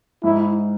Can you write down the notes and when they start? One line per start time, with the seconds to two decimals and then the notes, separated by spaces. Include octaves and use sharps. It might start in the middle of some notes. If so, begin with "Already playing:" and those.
0.23 G#2 E4